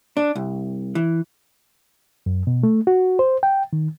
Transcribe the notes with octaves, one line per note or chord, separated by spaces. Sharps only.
D4
C2
E3
F#2
B2
A3
F#4
C5
G5
D#3